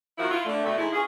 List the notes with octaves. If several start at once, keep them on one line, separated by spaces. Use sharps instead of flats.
D#3 F3 A#3 E4 F#4
E4 F4
D3 A3
B2 G3 A3
G#2 E3 G#3 A3 E4
C#4 F4 G#4